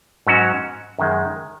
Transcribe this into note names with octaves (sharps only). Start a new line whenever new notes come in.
G#2 F#3 C#4 F#4 C#5
F#2 D#3 G#3